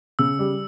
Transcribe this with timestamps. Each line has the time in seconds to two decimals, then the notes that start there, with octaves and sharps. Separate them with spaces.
0.19 C#3 E6
0.39 G3